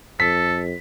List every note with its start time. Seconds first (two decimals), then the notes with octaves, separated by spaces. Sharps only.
0.20 F2 A4 B6